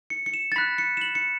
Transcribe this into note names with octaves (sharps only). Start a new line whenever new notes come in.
C#7
C#7
E7
A6
B5 F#6 B6
C#7
E7
F#7
C#7